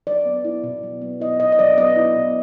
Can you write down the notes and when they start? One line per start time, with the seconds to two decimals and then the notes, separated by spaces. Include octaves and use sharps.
0.07 F#3 D5
0.26 B3
0.45 E4
0.64 B2
0.83 F#3
1.02 B3
1.20 E4 D#5
1.39 B2 D#5
1.52 D#5
1.59 F#3 D5
1.77 B3 D#5
1.96 E4
2.15 B2